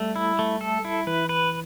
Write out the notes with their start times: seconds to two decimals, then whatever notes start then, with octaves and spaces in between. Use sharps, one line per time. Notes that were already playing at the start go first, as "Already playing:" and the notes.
Already playing: G3 A3
0.16 E4
0.39 A3
0.61 A4
0.85 E4
1.07 E3 B4
1.29 B4